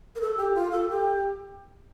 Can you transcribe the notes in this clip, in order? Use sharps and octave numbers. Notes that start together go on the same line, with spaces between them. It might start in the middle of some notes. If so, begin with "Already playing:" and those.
A#4
A4
G4
F4
A4
G4